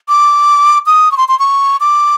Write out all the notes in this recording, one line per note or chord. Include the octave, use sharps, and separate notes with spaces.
D6
D#6
C#6
C6
C6
C#6
D6